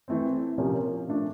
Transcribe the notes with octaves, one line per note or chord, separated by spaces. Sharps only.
E3 A3 C4
C3 F3 A#3 C#4
F3 A3 D4